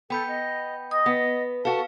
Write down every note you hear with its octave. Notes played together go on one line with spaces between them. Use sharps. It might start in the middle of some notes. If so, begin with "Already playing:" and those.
B3 A4 G5 B5 G6
D#5
D#5 D#6
B3 B4
F#4 A4 F5 A5